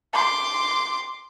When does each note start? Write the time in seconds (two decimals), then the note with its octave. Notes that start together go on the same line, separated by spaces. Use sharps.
0.13 C6 D6